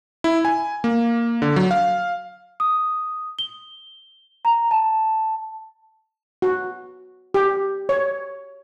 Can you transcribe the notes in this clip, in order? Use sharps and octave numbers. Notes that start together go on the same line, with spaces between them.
E4
G#5
A#3
D3
F#3
F5
D#6
G7
A#5
A5
F#4
G4
C#5